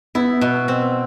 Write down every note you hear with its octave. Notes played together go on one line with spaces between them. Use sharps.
B3 E4
B2
C4